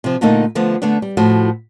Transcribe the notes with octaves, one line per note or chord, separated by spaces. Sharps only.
C3 F3
A#2 D3 A3 A#3 D#4
D3 F3 A3 B3
D3 A3 B3 D4
G3
A2 F3 F#4